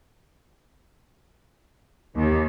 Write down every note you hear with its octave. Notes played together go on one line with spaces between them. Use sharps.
D#2